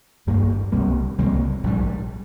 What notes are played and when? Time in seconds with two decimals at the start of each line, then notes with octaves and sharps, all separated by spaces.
0.27 G#1 G2 G3 A#3
0.72 C2 C3 G3 A#3
1.18 C2 C3 G3 A#3
1.64 A#1 G#2 G3